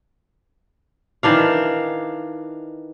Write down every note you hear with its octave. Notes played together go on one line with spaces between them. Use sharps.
D#3 E3 D4 F5